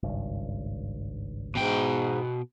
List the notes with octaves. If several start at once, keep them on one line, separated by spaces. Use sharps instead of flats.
G#1 C#2 G2
G#2 B2 G5